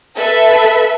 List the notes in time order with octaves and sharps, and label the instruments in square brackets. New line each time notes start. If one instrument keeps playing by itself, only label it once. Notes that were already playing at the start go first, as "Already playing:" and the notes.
[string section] A4 B4 E5